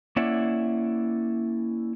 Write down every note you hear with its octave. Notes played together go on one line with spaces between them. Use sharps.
A#3 C#4 E4 D5 E5 F#5